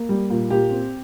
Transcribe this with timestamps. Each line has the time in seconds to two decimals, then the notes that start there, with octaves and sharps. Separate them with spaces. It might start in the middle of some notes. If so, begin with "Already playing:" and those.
Already playing: A#3
0.09 G3
0.30 A#2
0.50 A#2 G4
0.71 C4